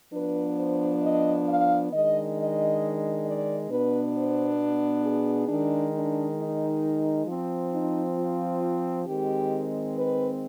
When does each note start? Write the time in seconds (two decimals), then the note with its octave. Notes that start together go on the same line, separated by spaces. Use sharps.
0.13 F3 B3 D4 B4
0.58 C5
1.02 D#5
1.47 F5
1.92 D#3 G#3 D4 D#5
2.36 D#5
3.26 D5
3.70 B2 B3 D4 B4
4.14 C5
5.04 G#4
5.48 D#3 G#3 D4
5.94 D4
6.38 D#4
7.27 F3 C4
7.72 D#4
8.17 F4
9.05 D#3 G#3 C4 G4
9.95 B4